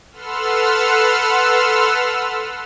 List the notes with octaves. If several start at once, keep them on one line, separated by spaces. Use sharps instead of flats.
A4 B4 F#5 C6 E6 F6